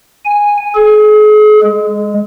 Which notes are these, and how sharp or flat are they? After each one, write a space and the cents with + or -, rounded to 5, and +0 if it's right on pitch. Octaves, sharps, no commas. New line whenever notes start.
G#5 -10
G#4 +40
G#3 -10